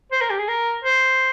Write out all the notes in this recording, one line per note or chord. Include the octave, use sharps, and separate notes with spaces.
C5
A#4
G4
G#4
A#4
C5